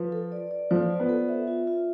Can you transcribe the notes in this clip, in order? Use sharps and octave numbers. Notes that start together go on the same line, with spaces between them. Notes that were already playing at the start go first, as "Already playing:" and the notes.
Already playing: F3 B4
A4
D5
D5
F3 C5
F4
B3
A4
E5
F4
F4